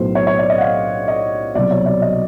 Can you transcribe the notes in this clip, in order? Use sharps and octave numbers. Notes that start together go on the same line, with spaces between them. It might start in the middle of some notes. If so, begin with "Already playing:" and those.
Already playing: B1 A2 F#3 B3 C5
C#5
C#5
D5
D#5
F#5
F5
D#5
C2 B2 F#3 D5
C#5
D5
D#5